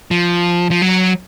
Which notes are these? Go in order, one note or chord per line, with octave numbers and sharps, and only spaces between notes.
F3
F3
F#3